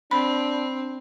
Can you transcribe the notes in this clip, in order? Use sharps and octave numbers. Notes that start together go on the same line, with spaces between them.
C4 D4 B5